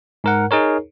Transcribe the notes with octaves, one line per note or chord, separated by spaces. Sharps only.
G#2 A#4 F#5
D#4 G#4 A#4 C#5